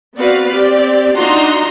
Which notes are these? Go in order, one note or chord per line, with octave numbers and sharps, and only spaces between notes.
B3 C4 F#4 B4 D5 F5
C4 G4 D5
D4 D#4 F4 F#4 A#5 C6